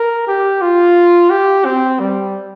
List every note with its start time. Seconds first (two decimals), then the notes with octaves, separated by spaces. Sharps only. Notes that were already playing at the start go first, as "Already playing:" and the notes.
Already playing: A#4
0.27 G4
0.62 F4
1.31 G4
1.65 C4
2.00 G3